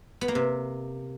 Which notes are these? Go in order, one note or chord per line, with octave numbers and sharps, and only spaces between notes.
B3
A#3
C3